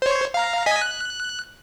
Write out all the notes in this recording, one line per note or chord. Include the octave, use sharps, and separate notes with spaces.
C5 C#5
F5 A#5
D#5 G#5 B6
F#6